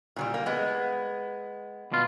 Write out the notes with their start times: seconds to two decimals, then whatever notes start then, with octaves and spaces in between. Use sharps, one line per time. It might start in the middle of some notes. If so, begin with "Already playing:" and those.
0.16 A#2 F#3 G3
0.34 A#3
0.46 G#3 B3
1.92 B2 F4